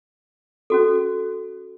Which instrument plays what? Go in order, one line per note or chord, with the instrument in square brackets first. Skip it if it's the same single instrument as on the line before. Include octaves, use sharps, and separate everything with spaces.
[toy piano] C#4 F#4 A4